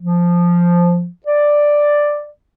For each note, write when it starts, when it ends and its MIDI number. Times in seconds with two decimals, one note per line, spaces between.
0.01 1.07 53
1.27 2.27 74